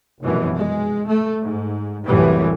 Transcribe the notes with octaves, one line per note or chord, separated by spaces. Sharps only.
F1 F#2 B2 E3
G#3
A3
G#2
C2 F#2 A2 E3 G3